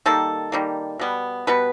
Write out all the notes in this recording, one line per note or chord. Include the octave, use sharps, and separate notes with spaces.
D#3 G3 A#3 A4
D#3 G3 A#3
B2 G3 B3
B2 G3 B3 B4